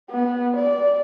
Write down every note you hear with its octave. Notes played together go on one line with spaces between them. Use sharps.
B3
D5